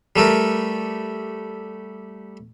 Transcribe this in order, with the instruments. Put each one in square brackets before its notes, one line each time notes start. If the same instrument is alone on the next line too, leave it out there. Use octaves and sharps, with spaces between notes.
[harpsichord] G3 A3 A4 A#4